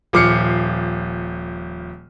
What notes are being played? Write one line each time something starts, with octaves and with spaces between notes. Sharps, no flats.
D#1 F3 D6 F6 C7 C#7